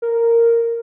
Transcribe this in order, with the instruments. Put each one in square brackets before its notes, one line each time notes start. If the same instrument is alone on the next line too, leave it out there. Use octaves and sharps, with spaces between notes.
[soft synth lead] A#4